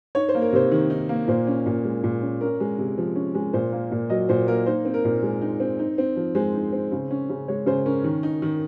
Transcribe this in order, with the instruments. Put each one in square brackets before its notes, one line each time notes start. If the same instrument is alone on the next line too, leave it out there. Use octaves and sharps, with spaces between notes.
[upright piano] D#4 C#5
C5
A#3
A#4
C3 C5
D#3
D#4
A#3
A#2 C5
C#4
A#2
G#3
A#2
C#4
C#4 A#4
G#3
C3
F3
C#4
G#3
A#2 C5
A#3
A#2
F#3 D#5
A#2 C5
A#3 A#4
D#4 C5
C4
A#4
A#2
G#3
D#4
C4
D#4
C4
F3
G#3 C5
D#4
C4
C#3
C#4
C#3
G#3 C#5
C#3 C5
C#4 A#4
D#3
D#4
D#3